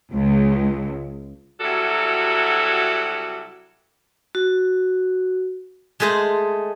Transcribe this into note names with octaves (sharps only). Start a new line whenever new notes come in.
C#2
C3 F#3 G3 E4 F#4 A4
F#4
G#3 A3 G#4 C5 A5